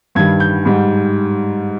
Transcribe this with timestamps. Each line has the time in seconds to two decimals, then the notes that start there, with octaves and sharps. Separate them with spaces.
0.15 G2 D#3 G3 G#6
0.40 G6
0.65 G#2 G3